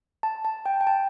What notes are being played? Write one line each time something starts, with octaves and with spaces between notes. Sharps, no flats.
A5
A5
G5
G5
A5